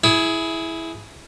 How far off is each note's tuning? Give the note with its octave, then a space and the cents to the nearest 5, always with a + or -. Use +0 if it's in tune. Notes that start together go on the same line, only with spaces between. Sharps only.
E4 -5 G#4 +15